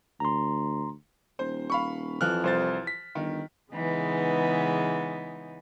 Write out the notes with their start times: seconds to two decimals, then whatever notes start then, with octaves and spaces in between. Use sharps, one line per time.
0.20 D2 A#5 C6
1.39 D#1 C5
1.70 F5 B5 C#6
2.21 F2 E3 F3 F6 F#6
2.44 C2 C5 A6
2.87 B6
3.15 G1 D#3
3.72 C#3 E3 G#3 B3 D#4